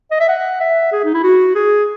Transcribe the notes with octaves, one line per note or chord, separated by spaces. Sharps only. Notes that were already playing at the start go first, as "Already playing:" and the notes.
D#5
E5
F#5
E5
G#4
D#4
E4
F#4
G#4